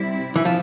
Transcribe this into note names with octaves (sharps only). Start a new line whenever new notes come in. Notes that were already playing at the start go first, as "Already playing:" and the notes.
Already playing: C3 G3 C4 E4
E3
F3